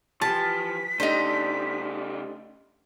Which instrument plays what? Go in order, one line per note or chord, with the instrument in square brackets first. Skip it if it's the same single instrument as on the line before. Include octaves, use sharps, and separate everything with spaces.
[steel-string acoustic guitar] E3 G4 [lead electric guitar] F3 [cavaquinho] A5 [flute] B6
[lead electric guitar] C#3 A3 [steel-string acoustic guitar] D4 G4 D#5 [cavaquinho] D#4 C5